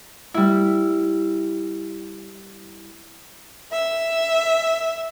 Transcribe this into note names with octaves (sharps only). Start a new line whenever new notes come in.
G3 E4
E5